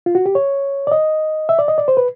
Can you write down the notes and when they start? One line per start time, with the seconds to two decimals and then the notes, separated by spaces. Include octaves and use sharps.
0.06 F4
0.15 F#4
0.26 G4
0.35 C#5
0.87 D5
0.92 D#5
1.49 E5
1.59 D5
1.68 D#5
1.78 D5
1.88 C5
1.97 B4